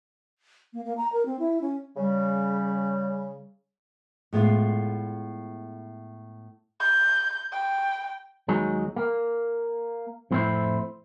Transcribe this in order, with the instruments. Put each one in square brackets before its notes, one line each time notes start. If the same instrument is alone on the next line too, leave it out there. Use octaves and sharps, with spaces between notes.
[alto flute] A#3
A#3
A#5
A#4
C4
E4
C#4
[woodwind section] C#3 G3
[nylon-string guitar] A2 G#3 B3 F4
[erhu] G6
G5
[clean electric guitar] D#2 F#3 G#3 D#4
A#3
F2 A2 B3 C4 E4 C5